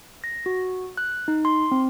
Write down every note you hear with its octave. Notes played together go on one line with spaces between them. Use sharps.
A#6
F#4
F#6
D#4
C6
C4